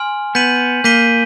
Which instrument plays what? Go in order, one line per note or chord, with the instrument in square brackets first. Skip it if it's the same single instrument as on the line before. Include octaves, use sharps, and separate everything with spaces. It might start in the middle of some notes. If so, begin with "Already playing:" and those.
Already playing: [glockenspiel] G#5 C6 F6
[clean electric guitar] B3 [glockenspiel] G6 B6 D#7 F#7
[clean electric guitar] A#3 [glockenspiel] G6 B6 D#7 G7